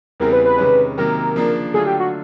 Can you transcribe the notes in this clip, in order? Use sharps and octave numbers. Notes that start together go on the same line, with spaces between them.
E2 C#3 E3 G3 C4 A#4
B4
B4
C3 D#3 G#3 C#4
C3 D#3 F#3 A#3 A#4
C#3 F3 A#3 D4
D3 F#3 A3 D4 F4 G#4
G4
F#4